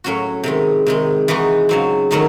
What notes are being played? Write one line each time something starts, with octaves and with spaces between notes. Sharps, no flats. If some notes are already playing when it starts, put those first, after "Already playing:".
A2 F#3 C#4 F#4
C3 D#3 G#3
C3 D#3 G#3
E3 G#3 D#4 F#4
C#3 F#3 C4
D#3 F#3 A3 D#4